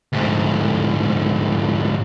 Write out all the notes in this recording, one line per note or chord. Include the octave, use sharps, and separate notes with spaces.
D2 G#2